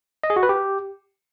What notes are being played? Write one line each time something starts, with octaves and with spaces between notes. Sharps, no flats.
D#5
G#4
F#4
B4
G4